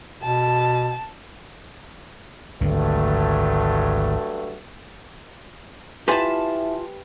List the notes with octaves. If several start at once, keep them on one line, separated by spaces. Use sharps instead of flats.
B2 A5
G#1 D2 G2 D3 F#3 A3
E4 F4 G4 B4 G#5 A5